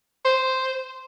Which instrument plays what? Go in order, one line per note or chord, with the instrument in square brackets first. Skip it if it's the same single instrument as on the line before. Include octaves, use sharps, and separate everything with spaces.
[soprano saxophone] C5